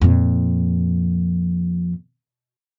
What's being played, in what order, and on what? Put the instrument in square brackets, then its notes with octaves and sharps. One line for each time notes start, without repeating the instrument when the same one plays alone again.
[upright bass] F2 A#2